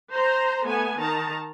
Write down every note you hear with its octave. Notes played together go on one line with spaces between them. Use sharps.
C5 A#5
A3 B3 G#5
D#3 A5 A#5